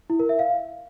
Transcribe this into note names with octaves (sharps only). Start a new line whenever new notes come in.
E4
A#4
E5
F5